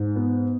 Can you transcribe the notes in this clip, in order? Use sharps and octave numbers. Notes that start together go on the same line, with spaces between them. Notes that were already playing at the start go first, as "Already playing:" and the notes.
Already playing: G#2
B3